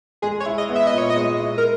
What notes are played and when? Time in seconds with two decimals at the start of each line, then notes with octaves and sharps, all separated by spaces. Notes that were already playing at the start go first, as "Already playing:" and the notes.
0.22 G#3 G#4
0.40 C#5
0.46 E4
0.58 D#5
0.69 B3
0.75 E5
0.87 D#5
0.93 A#2
0.98 C#5
1.10 D#5
1.16 G#3
1.39 E4
1.58 A#4